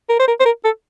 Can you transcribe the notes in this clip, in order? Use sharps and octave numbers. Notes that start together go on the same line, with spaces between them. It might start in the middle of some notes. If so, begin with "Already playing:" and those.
A#4
C5
A#4
C5
A#4
A4